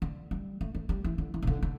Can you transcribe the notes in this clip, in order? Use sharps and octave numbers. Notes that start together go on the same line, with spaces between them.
D3
G3
A3
A3
G3
E3
D3
E3
B2
D3
D3